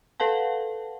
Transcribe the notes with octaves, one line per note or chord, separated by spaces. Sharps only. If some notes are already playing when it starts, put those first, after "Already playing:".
A4 B4 F5 F#5 A5